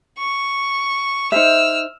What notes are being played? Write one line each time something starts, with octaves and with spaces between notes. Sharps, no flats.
C#6
D#4 C5 E5 E6 F6